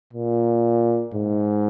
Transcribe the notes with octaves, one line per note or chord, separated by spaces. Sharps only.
A#2
G#2